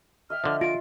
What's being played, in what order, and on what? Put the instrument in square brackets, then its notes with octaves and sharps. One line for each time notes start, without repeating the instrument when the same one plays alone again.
[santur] D#5 E5 G5 [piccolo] F6
[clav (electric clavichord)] D3 F3
[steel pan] F4 [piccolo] D7